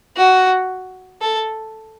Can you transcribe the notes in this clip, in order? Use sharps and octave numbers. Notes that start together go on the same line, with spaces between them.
F#4
A4